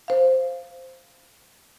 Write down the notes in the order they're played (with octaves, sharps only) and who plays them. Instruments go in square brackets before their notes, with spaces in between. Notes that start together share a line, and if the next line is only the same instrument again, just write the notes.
[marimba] C5 F5